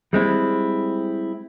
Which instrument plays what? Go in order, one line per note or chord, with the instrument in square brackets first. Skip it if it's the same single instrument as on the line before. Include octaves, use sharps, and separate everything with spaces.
[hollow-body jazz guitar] G3 G#3 C4 E4